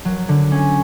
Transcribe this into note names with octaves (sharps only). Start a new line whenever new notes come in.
F#3
D3
C#4